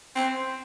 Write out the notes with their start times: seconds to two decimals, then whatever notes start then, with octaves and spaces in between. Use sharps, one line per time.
0.16 C4